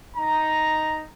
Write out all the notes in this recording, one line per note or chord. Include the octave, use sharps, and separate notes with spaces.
D#4 A#5